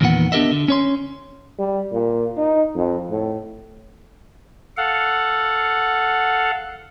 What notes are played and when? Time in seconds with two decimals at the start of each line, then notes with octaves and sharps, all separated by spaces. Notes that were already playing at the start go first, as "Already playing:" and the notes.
0.01 E2 A#2 D#3 B3 F#5
0.32 B3 D4 G4 A#4 D#5 E5
0.51 D3
0.68 C#4 C#5 C6
1.59 G3
1.92 A#2
2.37 D#4
2.75 F2
3.10 A2
4.77 A4 F5 F#5